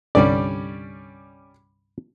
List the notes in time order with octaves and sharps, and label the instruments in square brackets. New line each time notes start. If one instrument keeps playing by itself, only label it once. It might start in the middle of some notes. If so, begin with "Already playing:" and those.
[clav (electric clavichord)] C2 G2 D3 [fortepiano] G3 C#4 D5